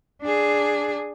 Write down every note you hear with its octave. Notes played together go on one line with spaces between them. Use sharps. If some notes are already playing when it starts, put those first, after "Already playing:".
D4 G#4